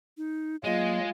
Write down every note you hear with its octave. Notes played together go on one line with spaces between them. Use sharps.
D#4
F#3 G#3 A#3 F4 D#5